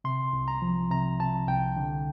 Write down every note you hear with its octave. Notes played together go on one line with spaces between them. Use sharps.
C3 C6
C2
A#5
F3
C3 A#5
C3 A5
C2 G5
D3